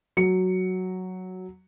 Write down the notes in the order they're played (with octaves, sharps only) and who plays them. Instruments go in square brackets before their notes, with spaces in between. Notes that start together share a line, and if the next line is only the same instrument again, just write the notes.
[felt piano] F#3 C#7